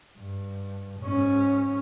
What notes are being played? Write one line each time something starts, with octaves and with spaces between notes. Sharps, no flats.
G2
G#2 C#4